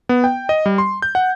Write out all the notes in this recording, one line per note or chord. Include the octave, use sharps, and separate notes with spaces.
B3
G5
D#5
G3
C6
G6
F#5